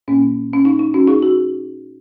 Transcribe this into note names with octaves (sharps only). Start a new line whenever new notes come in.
A#2 A#3 C#4
C#4
D#4
D#4
C#4 F#4
D#4 G#4
F#4